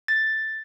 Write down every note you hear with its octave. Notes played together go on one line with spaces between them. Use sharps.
A6